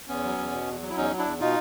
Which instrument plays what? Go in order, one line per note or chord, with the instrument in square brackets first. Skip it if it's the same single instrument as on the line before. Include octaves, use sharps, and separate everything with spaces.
[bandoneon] E2 B3 C#4
F#3
E2
B2
E2
F#3
E4
E2 C#4 D#4
F#3
D4 E4
E2
B2 D#4 F4